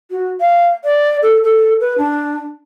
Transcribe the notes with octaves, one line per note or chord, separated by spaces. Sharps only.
F#4
F5
D5
A4
A4
B4
D4